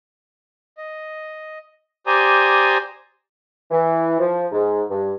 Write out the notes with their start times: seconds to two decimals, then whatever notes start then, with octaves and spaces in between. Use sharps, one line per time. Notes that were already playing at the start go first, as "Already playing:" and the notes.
0.78 D#5
2.07 G4 C5 D5 G#5 A#5 D#6
3.71 E3
4.19 F3
4.52 G#2
4.90 G2